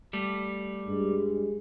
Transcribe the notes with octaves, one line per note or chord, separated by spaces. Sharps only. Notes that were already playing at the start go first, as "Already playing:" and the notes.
G3 A3
G2 G#3